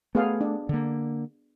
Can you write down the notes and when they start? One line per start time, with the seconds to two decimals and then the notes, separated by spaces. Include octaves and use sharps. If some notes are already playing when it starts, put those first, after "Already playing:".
0.15 A3 B3 G#4 F5
0.41 D4
0.69 D3 A#3